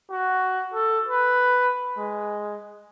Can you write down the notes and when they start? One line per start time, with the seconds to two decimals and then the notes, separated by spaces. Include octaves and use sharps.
0.10 F#4
0.74 A4
1.08 B4
1.98 G#3